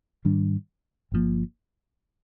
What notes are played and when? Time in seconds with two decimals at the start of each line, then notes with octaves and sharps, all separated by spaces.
0.25 G#2 D#3 G3 D4
1.12 G1 G2 F3 A#3